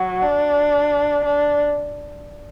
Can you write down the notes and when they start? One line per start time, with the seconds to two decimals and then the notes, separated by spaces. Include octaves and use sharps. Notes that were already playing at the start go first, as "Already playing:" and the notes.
Already playing: F#3
0.22 D4
1.25 D4